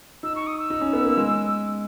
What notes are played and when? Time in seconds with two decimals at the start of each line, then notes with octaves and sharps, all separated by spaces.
0.23 D#4 E6
0.35 C#6
0.47 D#6
0.58 E6
0.70 D#4
0.81 C#4
0.93 B3
1.05 A#3
1.17 G#3